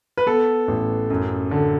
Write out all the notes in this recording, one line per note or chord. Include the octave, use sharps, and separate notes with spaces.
B4
B3 A4
A1
F#2
D3